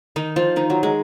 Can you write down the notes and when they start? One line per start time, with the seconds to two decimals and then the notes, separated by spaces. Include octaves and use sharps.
0.16 D#3 D#4
0.36 F3 F4
0.56 D#3 D#4
0.70 F#3
0.83 G#3